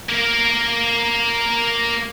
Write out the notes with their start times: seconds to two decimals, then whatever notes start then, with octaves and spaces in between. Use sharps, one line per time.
0.09 A#3 A#4